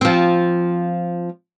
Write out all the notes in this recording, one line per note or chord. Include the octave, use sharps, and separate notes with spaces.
F3 C4